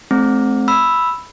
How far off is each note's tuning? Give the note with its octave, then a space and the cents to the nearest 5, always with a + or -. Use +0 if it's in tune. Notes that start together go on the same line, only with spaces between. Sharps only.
A3 -40 C4 +0
B5 +0 E6 +0